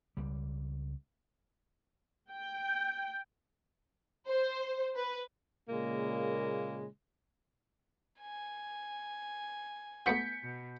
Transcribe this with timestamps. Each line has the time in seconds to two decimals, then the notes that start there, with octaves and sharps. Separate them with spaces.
0.17 C#2 G3
2.30 G5
4.28 C5
4.96 B4
5.69 A#2 C#3 G#3 A#3
8.20 G#5
10.06 A3 B3 F#4 G6 B6 C#7
10.44 B2